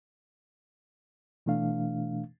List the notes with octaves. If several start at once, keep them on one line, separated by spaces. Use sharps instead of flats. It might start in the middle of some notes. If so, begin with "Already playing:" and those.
B2 E3 A3 D4 F5